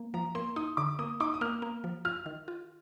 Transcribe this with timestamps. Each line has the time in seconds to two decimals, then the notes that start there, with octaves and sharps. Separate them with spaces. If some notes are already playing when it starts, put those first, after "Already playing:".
Already playing: A#3
0.14 F3 A#5
0.35 A#3 C6
0.56 D#4 D#6
0.77 D3 D6
0.99 A#3 D#6
1.20 D#4 D6
1.34 D#6
1.41 A#3 F6
1.62 A#3
1.84 F3
2.05 F4 F6
2.26 D#3
2.48 F4